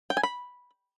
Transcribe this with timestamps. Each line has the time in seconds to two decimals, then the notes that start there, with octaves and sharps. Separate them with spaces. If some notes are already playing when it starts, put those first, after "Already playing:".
0.10 G5
0.17 G#5
0.23 B5